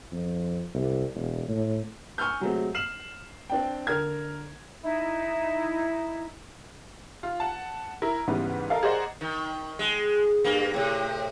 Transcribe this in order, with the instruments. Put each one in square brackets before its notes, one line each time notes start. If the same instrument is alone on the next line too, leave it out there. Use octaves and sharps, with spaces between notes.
[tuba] F2
C2
E1
A2
[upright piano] G#5 C#6 E6 F6 G6
C3 F#3 G#3 A3 C4
F6 C7 E7 F#7
C4 D4 G5
D3 A#4 F6 G#6
[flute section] D#4 E4
[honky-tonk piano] F4
F#5 A5
E4 A#4
G#2 C#3 E3 G3 B3
A4 A#4 D#5 F5
G#4 A#4 C5 D5 D#5 F#5
[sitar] D#3
G#3
G2 A#3
A2 C3